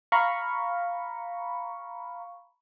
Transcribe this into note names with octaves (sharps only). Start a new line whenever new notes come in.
F5 A#5 B5 C#6